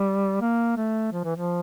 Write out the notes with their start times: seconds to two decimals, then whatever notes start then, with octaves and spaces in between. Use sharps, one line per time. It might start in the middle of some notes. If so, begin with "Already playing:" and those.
Already playing: G3
0.41 A#3
0.77 A3
1.12 F3
1.24 E3
1.36 F3